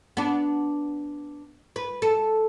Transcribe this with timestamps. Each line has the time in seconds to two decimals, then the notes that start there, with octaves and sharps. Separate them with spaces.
0.17 B3 D4
1.76 B4
2.02 A4